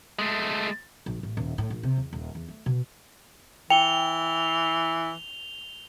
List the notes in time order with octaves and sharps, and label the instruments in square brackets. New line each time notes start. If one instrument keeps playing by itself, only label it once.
[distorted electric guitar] G#3 A3
[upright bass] A#1
A1
D#1
A2
A#1
C3
E2
D#1
E2
A3
B2
[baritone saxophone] E3 [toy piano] G5 [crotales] F7 G7